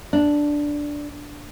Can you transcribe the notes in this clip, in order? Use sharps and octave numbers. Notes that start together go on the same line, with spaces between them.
D4